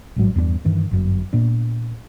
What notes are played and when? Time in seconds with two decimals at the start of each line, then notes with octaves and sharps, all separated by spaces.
0.16 A1 G#2 F#3 G3
0.36 E2 G2 B3 D4
0.65 G2 D#3 E3
0.91 G1 F#2
1.33 A#2 B3 D4